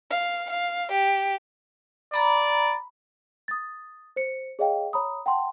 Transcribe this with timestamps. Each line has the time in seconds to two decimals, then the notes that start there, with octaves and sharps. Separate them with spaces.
0.10 F5
0.50 F5
0.91 G4
2.14 D5 A#5 B5
3.48 D#6 A6
4.16 C5 C#7
4.59 G#4 C#5 D#5 F5 G5
4.93 C#5 A#5 B5 D#6
5.26 F#5 G5 A5 C6